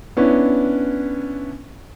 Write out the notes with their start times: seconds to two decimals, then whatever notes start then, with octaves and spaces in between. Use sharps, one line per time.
0.17 B3 C#4 D4 E4